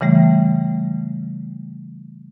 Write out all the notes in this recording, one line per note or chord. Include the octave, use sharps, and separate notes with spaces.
C#3 E3 G3 A3